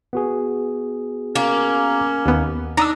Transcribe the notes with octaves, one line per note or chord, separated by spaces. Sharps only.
B3 F#4 G#4
A#3 C#4
D#2 B3
D4 D#4 A#5 D#6 E6